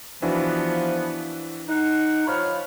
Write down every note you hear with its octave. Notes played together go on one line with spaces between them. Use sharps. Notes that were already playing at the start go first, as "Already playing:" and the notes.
E3 F3 B3 D4 F#4
D#4 F#5
F3 C#5 B5 F6